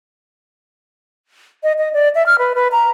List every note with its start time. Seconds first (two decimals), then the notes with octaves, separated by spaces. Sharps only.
1.63 D#5
1.78 D#5
1.93 D5
2.15 E5
2.26 F6
2.39 B4
2.55 B4
2.72 A#5